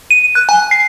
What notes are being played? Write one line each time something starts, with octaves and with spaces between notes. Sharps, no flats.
D#7
F#6
G#5
C7